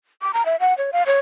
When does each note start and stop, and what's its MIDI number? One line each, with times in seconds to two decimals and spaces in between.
0.22 0.31 86
0.33 0.45 82
0.45 0.56 76
0.60 0.76 78
0.78 0.91 73
0.93 1.03 77
1.06 1.19 73